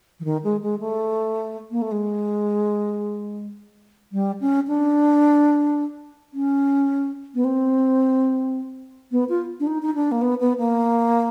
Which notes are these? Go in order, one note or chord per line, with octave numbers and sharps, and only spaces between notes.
E3
D#3
G#3
G#3
A3
A#3
A3
G#3
G3
C#4
D4
C#4
B3
C4
B3
F4
D4
D#4
D#4
D4
A#3
B3
B3
A#3